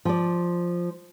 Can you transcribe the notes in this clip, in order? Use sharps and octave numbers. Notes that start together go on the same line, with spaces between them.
F3 D5